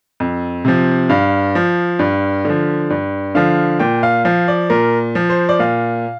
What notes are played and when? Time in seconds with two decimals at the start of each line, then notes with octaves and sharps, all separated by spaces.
0.20 F2
0.65 C3 F3
1.09 G2 F5
1.55 F3
1.99 G2
2.45 D3 F3
2.90 G2
3.35 D3 F3 F5
3.80 A#2 G5
4.03 F5
4.25 F3 F5
4.48 D5
4.70 A#2 A#4
5.15 F3
5.29 C5
5.49 D5
5.59 A#2 F5